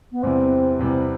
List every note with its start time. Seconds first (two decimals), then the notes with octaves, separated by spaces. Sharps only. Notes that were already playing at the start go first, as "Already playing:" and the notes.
0.12 B3
0.22 E2 C3 E3 G3 C4
0.79 E2 C3 E3 G3